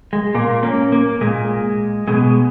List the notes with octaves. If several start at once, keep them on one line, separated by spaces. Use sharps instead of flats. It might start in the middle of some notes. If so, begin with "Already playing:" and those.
G#3
A#2 A#3
A#3 C#4
A#3
A#2 G#3
B2 G#3